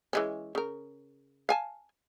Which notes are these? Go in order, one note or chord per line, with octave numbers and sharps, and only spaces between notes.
E3 G#3 C#4
C#3 A#4
F5 G#5 A5